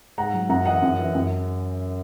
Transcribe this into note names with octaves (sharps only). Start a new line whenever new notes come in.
G#2 F#5 A#5
F#3
F#2 F#5 A#5
E3 D#5 F#5
F#2
E3
F#2